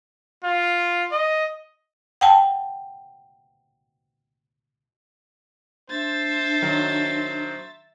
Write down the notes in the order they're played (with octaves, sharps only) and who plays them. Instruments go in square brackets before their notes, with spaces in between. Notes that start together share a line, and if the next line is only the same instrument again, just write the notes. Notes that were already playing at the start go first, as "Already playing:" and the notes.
[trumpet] F4
D#5
[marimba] F#5 G5 A5
[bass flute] D4 [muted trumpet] C5 [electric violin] E5 A6
[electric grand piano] D#3 F#3